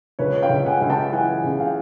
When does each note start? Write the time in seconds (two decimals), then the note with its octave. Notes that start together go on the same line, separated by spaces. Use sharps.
0.19 C#2 B4 C#5
0.42 F5 G5
0.49 C#2
0.66 F#5 G#5
0.81 C#2
0.90 G5 A5
1.12 E3 F#5 G#5
1.44 C#3
1.60 F5 G5